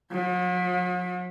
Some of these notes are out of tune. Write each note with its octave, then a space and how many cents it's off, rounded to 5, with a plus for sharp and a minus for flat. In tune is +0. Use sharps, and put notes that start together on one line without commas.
F#3 -45